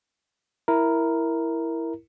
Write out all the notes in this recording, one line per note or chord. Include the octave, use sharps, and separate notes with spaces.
E4 A#4